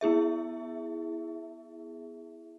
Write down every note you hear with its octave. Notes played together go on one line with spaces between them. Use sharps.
B3 E4 G#4 E5